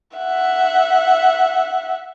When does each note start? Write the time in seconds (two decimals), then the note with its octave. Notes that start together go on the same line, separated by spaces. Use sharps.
0.17 E5 F#5